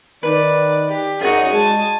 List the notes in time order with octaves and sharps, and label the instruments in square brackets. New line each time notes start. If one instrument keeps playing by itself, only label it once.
[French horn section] D#3 [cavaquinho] B4 [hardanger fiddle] D5
[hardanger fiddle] G4
[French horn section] F#2 [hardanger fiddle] D#4 G#4 [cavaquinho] F4 F#4
[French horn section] G#3 [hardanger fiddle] G#5 A5